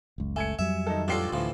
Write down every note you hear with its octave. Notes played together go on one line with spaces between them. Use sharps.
F#1 C#2
A3 G#5 G#6 C#7
F2 F#3 G3 E5
D#3 D#4 A4
A1 D4 F4 G4 A4 C7
D2 A2 E3 F3